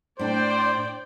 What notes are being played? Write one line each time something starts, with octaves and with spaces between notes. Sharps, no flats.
A2 D4 C5 D5 G5